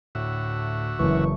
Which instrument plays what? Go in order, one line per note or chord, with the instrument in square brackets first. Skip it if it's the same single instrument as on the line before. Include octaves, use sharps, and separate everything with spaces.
[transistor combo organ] D2 F#4 E5 [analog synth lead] A2
[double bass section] F#1 A3 [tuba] E3 [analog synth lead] C#6